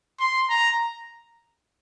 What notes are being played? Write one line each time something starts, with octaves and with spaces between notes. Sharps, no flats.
C6
A#5